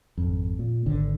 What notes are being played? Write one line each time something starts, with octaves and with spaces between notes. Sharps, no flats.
G#1 F2
A#2
G#1 D3